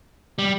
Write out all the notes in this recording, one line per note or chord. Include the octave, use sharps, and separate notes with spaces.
G3